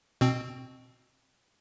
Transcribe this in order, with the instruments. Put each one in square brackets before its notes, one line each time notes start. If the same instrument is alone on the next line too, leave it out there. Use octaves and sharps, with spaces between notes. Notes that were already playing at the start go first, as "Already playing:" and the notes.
[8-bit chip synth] B2 C4